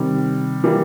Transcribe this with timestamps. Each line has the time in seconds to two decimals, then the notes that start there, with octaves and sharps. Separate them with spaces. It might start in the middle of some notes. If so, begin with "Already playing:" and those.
Already playing: C3 D#3 G3
0.64 E3 G3 A#3